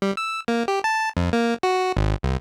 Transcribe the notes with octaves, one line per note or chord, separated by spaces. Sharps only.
G3
E6
A#3
G4
A5
F2
A#3
F#4
G#1
C2